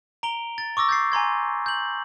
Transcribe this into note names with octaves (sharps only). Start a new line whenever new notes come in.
A#5 D7 F7 G7
A6
C#6 D6 E6 A#6
G6 A6 C7
G#5 A#5 C6 G#6
G6 F#7